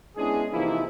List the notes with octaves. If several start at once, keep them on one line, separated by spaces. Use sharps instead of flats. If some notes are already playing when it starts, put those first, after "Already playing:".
G#3 B3 C#4 D4 E4 G#4
C3 E3 F3 A#3 D#4 E4